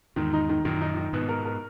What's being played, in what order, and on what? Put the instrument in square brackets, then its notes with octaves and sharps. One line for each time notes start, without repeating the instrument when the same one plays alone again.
[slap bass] E2 G#2 [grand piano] D#3
[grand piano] D#4
D#3
[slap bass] F#2 A#2 [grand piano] D#3
[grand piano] D#4
D#3
[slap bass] G#2 B2 [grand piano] B3
[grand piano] A#4
A#4